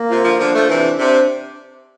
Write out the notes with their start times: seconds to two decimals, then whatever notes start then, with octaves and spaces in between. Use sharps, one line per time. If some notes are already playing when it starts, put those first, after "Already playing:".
Already playing: A#3
0.10 C3 F4
0.25 D3 F3
0.40 D3 F3 D4
0.54 F3 A3
0.69 C3 E3 D4
0.99 C3 D4